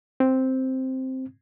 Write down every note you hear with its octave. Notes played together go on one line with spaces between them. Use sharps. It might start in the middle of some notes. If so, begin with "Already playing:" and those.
C4